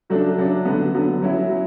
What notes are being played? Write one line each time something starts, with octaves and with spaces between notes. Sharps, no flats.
C#3 F#3 A3 D4
C#3 F#3 A3 D4
D3 F#3 B3
D3 F#3 B3
F#3 C#4 E4
F#3